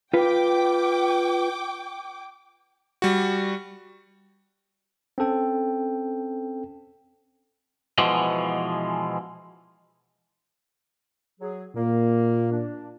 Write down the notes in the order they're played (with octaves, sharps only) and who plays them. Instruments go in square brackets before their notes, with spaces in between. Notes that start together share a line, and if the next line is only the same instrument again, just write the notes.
[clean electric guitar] F4 B4 [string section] G5 D6
[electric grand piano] G3 F#4
[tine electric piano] C4 C#4 A4 G5
[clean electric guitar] B2 E3 F3 G#3
[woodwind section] F#3 G#4
[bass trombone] A#2 [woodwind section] A#3
[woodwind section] D4